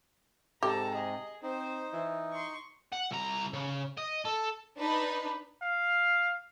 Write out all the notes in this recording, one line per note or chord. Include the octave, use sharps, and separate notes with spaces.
G#2 C3 G4 A4 A5 A#5
G#4 D#5
C4 D#4 C5
E3
C6 C#6
F#5
C2 A#5
C#3
D#5
A4
D4 D#4 B4
F5